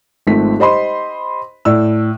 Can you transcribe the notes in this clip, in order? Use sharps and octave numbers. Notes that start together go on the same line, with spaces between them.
G#1 F3 A3 C4 B6
G4 C5 D#5 B5 C6
A2 D5 E6